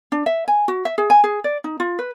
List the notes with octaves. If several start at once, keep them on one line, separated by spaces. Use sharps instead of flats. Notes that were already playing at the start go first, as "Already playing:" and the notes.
D4
E5
G#5
F#4
E5
G#4
G#5
G#4
D5
D#4
F4
B4